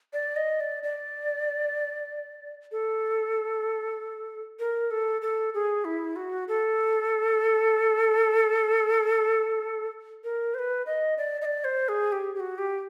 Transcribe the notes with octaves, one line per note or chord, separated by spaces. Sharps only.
D5
D#5
D5
D5
A4
A#4
A4
A4
G#4
E4
F#4
A4
A#4
C5
B4
D#5
D5
D#5
D5
C5
G#4
G4
G4
F#4
G4